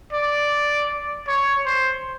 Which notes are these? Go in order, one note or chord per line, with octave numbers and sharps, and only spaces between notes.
D5
C#5
C5